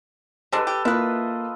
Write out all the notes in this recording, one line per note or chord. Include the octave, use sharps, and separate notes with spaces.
G3 G#3 D4 A4 B4
G4
A#3 E4 F4 B4 D#5